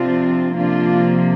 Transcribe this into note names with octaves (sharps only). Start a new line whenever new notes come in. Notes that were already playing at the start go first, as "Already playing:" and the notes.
Already playing: C3 F3 C4 D4 F4
C3 F3 A#3 D4 F4